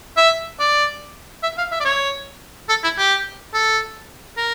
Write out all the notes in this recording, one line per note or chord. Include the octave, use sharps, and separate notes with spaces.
E5
D5
E5
F5
E5
D5
C#5
A4
E4
G4
A4
A#4